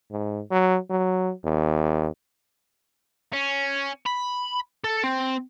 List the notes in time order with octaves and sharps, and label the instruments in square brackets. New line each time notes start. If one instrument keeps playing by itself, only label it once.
[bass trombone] G#2
F#3
F#3
D#2
[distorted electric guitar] C#4
B5
A4
C4